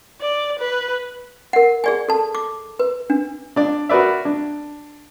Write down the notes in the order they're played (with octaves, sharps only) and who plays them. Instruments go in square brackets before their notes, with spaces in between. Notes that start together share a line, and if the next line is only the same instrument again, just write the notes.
[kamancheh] D5
B4
[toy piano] A#4 F#5
G#4 D5 G#5
A4 A5
D6
B4
D4
[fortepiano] D4 D5
F#4 A#4 B4 D5 E5
D4